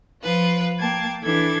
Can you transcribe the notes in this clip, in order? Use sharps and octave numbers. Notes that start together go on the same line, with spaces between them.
F3 F4 B4
A#3 G5 A5 G#6 A6
E3 D4 A4 G#6 A6